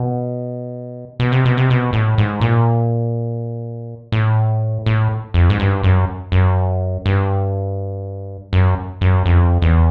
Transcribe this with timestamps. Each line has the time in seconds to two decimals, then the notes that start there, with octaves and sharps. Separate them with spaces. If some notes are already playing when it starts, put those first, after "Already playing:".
Already playing: B2
1.20 B2
1.32 C3
1.45 B2
1.57 C3
1.70 B2
1.93 A2
2.18 G#2
2.41 A#2
4.12 A2
4.86 A2
5.34 F2
5.50 G#2
5.60 G2
5.83 F#2
6.32 F#2
7.06 G2
8.53 F#2
9.01 F#2
9.26 F2
9.62 E2